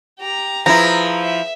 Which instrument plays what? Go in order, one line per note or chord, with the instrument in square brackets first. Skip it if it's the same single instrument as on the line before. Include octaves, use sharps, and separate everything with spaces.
[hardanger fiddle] G4 A#5
[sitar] F3 E4 [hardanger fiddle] G#4 B4 [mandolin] A#5
[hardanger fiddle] E5